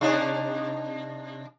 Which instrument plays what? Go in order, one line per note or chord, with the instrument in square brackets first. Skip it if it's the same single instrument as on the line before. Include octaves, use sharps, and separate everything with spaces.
[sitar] C3 D4 D#4